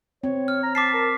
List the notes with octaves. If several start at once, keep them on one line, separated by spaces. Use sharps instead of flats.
C4 C#5
F6
A#5
A5 D6 B6 C7
A#4